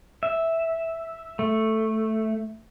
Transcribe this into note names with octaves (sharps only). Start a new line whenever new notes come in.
E5
A3